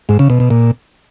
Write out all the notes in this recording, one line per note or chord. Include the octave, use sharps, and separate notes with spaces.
G#2
C#3
B2
B2
A#2